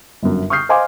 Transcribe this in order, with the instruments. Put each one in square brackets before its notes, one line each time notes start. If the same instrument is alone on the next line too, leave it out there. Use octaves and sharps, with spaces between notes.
[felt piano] G1 F#2
C#6 D#6 F6 G6 C7
C5 D#5 F5 G#5 C6 D6